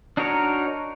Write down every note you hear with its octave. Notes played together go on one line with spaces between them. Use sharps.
D4 D#4 F#4 A#4 C#5